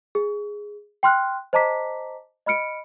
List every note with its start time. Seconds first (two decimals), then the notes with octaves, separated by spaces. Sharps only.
0.15 G#4
1.03 G5 C6 F6 F#6
1.53 C5 D#5 A5 A#5 D6 B6
2.46 D#5 B5 F6 C#7 D7